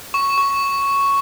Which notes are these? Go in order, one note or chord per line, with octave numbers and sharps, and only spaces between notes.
C#6
C#6